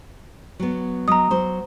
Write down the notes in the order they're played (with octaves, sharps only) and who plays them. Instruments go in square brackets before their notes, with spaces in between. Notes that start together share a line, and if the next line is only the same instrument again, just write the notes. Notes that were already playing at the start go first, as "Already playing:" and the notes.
[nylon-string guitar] F#3 B3
[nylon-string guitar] F#3 D#5 [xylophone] A#5 D#6
[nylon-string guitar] F#3 C5